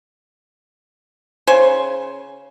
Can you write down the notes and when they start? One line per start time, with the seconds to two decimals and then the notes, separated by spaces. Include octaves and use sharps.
1.47 C#3 C5 G#5